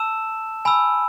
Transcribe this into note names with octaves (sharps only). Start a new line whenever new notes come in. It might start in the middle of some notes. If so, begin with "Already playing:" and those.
Already playing: A5 E6 E7
G#5 B5 E6